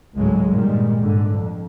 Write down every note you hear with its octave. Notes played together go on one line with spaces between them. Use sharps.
G#1 C#2 A2 F#3 G#3
G2 A#2 D#3 G3 G#3
G#2 D3
F2